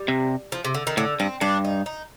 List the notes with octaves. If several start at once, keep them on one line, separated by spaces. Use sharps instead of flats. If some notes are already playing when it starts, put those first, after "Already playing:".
Already playing: G3
C3
F3
C3
D3
D#3
A2 D3
G2 C4
G2 D4
D#4
D#4